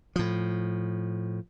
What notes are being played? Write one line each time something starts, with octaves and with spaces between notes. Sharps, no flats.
A2 F3